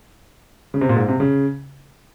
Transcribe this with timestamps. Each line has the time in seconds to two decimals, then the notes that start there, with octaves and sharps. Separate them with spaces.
0.74 C#3
0.81 C3
0.89 A#2
0.96 G#2
1.08 C3
1.20 C#3